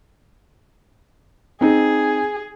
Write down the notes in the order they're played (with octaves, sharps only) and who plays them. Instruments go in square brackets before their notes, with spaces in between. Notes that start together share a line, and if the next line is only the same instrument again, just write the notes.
[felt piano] C4 D#4 [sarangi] G#4